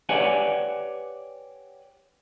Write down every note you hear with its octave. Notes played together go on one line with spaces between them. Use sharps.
G4 B4 C#5 D5 F#5 G#5